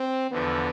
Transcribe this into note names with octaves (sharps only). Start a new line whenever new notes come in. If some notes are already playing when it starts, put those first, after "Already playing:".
Already playing: C4
E2 D3 F3 B3